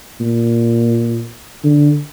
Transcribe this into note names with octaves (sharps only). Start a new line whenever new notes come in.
A#2
D3